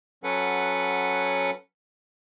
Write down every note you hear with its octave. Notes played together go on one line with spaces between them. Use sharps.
F#3 C#4 A4 B4 F#5